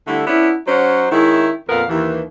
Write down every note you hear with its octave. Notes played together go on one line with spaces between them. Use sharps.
D3 G3 A3 E4
B3 C#4 D4 E4
F#3 C#4 D#4 C5 F#5
D#3 G#3 C#4 E4
F2 A#2 B3 A#4 F5
D#2 E3